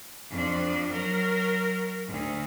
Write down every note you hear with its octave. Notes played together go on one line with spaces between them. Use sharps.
F2 D4
F#3 A#4
D2